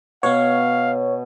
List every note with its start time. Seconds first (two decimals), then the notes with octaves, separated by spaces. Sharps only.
0.23 B2 B3 C#5 F5